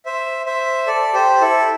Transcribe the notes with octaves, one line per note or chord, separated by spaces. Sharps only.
C5 E5
C5 E5
A4 D5
G4 C5
E4 A4